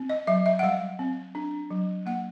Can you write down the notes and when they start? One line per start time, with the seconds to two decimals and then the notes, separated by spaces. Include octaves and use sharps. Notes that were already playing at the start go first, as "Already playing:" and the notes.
Already playing: C4
0.09 D#5
0.27 F#3 E5
0.46 E5
0.59 F#5
0.63 G3 F5
0.99 C4
1.35 D4
1.71 F#3
2.06 A#3 F#5